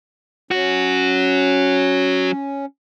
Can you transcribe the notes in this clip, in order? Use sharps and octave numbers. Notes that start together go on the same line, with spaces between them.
F#3 C#4 F#4